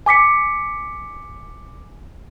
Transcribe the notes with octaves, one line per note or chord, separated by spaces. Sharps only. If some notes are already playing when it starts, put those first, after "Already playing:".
G#5 D6 B6 C#7